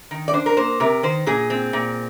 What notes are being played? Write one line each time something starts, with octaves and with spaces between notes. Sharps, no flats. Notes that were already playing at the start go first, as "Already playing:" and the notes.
D#3
D5
D4 C5
A#4
A#3 C5
C3 A#4
D#3 C5
A#2 G#4
C4
A#2